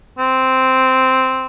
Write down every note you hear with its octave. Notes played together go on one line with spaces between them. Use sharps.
C4